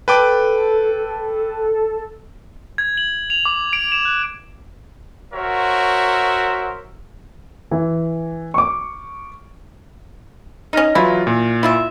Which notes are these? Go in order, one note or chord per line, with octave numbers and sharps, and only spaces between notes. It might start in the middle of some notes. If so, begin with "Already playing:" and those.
A4 B4 G5 D6
G#6
F#7
F7
D6
D7
E7
F#6
F#4 A#4 C5 C#5 E5
E3
C#6 D6
C#4 D#4 D#5 F6 A#6
E3 F#3 E4 F4
A#2
E4 F4 E5